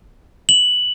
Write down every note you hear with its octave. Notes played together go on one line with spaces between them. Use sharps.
F#7